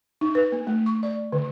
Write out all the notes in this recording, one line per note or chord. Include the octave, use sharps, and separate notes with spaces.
D#4
B4
A#3
A3
C#6
D5
D3